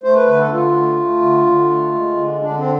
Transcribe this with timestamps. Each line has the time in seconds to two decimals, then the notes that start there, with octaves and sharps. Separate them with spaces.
0.04 A3 C5
0.15 B4
0.27 D3 B4
0.40 A4
0.51 D3 F4
0.75 A3
0.99 A3
1.22 D3
1.46 D3
1.70 A3
1.94 G#3
2.17 D3
2.41 D3 D4
2.57 C4